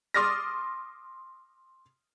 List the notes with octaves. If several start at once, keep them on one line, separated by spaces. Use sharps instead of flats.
C6 D6 D#6 F6 A6 A#6